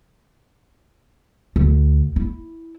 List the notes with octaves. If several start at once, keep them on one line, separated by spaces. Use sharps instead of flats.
D2
E4